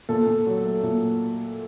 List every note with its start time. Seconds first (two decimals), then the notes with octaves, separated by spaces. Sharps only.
0.09 A#2 A4
0.27 A#2
0.47 F#3
0.65 A3
0.83 A#2